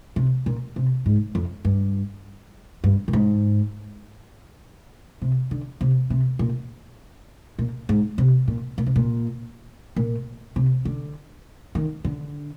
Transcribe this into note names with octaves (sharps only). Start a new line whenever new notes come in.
C3
A#2
C3
G#2
F2
G2
G2
A#2
G#2
C3
D3
C3
C3
A#2
A#2
G#2
C3
A#2
A#2
C3
A#2
A#2
C3
D3
D#3
D3